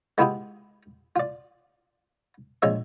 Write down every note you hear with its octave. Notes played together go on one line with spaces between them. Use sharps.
G#3 B3 E4 F4 G4 G#4
F4 D5
A#1 G#3 C#5 E5